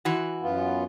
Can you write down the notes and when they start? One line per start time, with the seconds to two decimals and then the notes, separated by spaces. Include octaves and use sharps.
0.05 E3 F#4
0.42 F#2 B3 F4